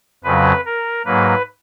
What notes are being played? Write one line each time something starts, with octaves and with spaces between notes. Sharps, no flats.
F2 C#3 F#3 B4
A#4
G#2 F#3 A#3 B4